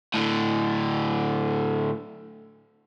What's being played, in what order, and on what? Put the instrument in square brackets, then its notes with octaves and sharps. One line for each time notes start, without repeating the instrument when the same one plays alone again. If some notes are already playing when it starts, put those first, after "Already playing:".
[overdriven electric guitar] A2 D3